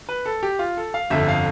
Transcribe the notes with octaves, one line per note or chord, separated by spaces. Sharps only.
B4
A4
G4
F4
A4
F5
G1 F2 D3 E5
F5